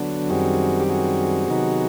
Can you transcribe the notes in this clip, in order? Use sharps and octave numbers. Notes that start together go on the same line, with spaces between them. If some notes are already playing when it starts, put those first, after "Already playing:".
Already playing: D3 F#3 B3 D4
F#2 D#3 G3 C4 F#4 G#4
G4
F#4 G#4
C3 D#3 F#3 B3 D#4